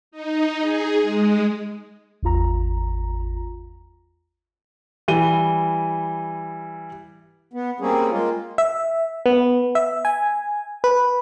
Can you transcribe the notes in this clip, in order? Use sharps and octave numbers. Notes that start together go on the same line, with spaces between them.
D#4
G#4
G#3
G#1 E2 F4 A#5
E3 G3 D#7 G7
B3
G3 A#3 C4 C#4 G#4
G#3 A#3 F4
E5
B3
E5
G#5
B4